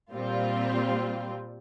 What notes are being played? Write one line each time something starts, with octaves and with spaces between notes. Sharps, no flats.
A#2 G3 C4 F4